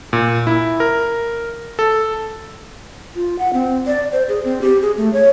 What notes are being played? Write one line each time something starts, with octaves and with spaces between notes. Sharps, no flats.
A#2
E4
A#4
A4
F4
F#5
C4
D5
C5
G#4
C4
G4
G#4
A3
C#5